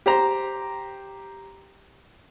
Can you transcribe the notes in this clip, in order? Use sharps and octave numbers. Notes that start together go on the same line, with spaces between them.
G4 C5 A#5